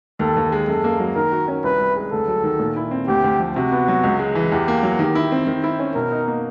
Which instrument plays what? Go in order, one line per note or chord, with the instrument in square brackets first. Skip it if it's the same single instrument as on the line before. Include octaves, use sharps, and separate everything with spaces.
[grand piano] D#2 [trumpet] A4
[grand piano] D#2
G#3
[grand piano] F#2 [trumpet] A4
[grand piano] A#3
F#3
[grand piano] D#3 [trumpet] A#4
[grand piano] F#4
C#4
[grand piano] C2 [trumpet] B4
[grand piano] C2
G#3
[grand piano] D2 [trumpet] A4
[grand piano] F#3
D#3
A#2
E4
C4
[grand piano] D2 [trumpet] G4
[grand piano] D2
F3
[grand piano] C3 [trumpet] F#4
[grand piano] B3
F#3
C#2
G#3
E3
[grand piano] E2 [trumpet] G4
[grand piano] A#3
F#3
[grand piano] D#3 [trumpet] G4
[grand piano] E4
C4
D#3
E4
C#4
[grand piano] B2 [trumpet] A#4
[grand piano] D#4
A#3